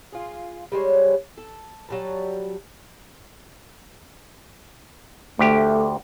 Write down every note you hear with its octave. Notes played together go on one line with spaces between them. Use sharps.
F4 G#4
G3 G#3 C5 C#5
A4
F#3 G3 A5
D2 A3 G4